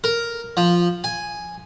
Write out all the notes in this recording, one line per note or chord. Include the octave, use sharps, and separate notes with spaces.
A#4
F3
G#5